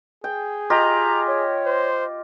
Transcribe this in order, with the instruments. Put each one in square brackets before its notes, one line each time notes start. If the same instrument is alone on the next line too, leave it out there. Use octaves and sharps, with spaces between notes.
[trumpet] G#4 [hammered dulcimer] G5
[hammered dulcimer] F4 G4 D#5 [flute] A#5
[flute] C#5
[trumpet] C5